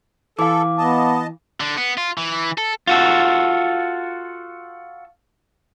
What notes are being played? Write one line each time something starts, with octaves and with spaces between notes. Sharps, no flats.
E3 A4 F5 D6
B3 D#5 A5
D3
B3
F4
E3
A4
F4 F#4 A4